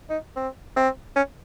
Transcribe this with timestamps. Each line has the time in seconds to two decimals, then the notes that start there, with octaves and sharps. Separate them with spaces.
0.10 D#4
0.36 C4
0.76 C4
1.16 C#4